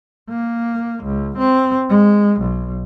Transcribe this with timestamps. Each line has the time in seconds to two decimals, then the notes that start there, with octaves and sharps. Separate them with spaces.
0.29 A#3
1.04 C#2
1.38 C4
1.89 G#3
2.41 B1